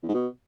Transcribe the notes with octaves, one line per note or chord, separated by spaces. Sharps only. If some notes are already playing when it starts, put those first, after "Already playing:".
E2
G#2
B2